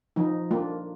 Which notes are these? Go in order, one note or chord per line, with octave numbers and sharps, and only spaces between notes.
F3 D#4
A#3 D4 F4